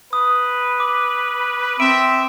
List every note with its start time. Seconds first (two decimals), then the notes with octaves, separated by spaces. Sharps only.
0.13 B4 D#6
0.80 D6
1.80 C4 E5 D7